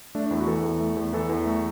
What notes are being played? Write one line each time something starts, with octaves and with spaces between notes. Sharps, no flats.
A3 D4
D4
E2 E4
F#4
E3 A4
E2
A3
E2
E3 A4
E2
A3